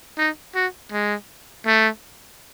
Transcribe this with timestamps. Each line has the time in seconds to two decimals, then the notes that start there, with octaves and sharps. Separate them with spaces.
0.18 D#4
0.55 F#4
0.92 G#3
1.66 A3